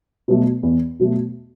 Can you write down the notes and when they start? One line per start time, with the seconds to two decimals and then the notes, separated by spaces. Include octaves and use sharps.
0.28 B2 F#3 A3
0.63 E2
1.00 B2 F#3 A3